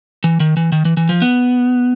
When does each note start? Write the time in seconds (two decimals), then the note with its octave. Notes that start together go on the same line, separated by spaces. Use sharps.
0.24 E3
0.40 D#3
0.57 E3
0.72 D#3
0.85 E3
0.97 E3
1.09 F3
1.22 B3